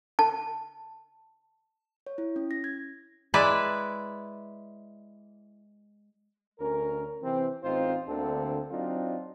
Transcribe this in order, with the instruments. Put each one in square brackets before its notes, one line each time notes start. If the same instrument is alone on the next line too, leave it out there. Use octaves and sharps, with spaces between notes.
[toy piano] A5
[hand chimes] C#5
E4
C#4
A#6
G#6
[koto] G#3 E4 B4 D5
[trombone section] D2 C#4 A#4
C3 E3 C4
A1 C4 D#4 F4 C5
D2 D3 A#3 C4 A4
F#3 C4 D4 D#4 F4